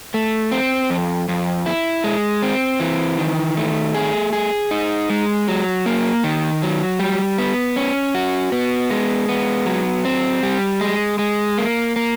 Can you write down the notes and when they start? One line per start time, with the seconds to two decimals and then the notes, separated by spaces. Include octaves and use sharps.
0.14 A3
0.52 C4
0.90 F2
1.29 F2
1.66 E4
2.04 G#3
2.43 C4
2.80 E3
3.18 D#3
3.57 A3
3.94 G#4
4.33 G#4
4.71 D#4
5.10 G#3
5.48 F#3
5.86 A#3
6.24 D#3
6.62 F#3
6.99 G3
7.38 B3
7.76 C#4
8.15 F#4
8.52 B3
8.91 G#3
9.29 B3
9.66 F#3
10.05 C4
10.43 G3
10.81 G#3
11.19 G#3
11.57 A#3
11.96 A#3